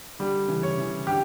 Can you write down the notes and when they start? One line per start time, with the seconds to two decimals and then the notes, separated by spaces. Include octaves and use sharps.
0.19 D3 G3
0.48 C#3 E3
0.63 C#5
0.77 C#3 E3
1.07 D3 G4